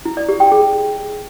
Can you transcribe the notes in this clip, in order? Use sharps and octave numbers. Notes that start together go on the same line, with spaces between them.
E4
D5
G4
G5
G#4